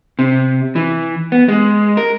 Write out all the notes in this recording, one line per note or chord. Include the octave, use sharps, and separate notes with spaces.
C3
E3
B3
G#3
A#4